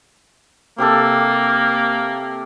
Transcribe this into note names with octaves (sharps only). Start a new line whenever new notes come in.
C3 A#3 G4 A4